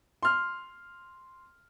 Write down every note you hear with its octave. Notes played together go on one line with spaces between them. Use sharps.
C6 F6